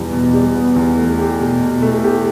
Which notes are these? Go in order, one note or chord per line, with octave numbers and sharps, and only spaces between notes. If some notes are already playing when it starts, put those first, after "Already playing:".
Already playing: E2 B2 G3 B3
B2
G3
B3
E2
A3
G4
B2
B2
A3
G4